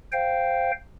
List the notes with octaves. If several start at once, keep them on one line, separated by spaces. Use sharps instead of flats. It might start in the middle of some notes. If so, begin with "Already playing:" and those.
C5 F5 G5